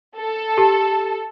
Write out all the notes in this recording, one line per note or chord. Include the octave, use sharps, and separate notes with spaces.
A4
G4 A5